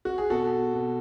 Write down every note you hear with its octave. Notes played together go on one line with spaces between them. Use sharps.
F#4
G#4
B2 F#4 A4
B2